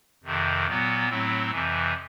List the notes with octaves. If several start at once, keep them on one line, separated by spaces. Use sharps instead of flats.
F2 C3 D#3
A#2 F#3 B3
A2 F#3 A3 C4
F2 C3 E3